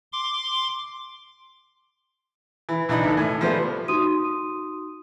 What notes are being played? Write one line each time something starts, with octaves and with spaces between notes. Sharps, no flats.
C6 D6
E3
B1 E3 D4 D#4 B5
D#2 A4
A2 G#5
F3 G3 A3 B3 C5
D#4 F#4 C6 D#6 D#7